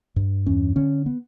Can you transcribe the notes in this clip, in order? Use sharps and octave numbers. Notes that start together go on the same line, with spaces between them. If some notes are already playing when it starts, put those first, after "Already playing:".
G2
E2 C#4
D3 C#4
B3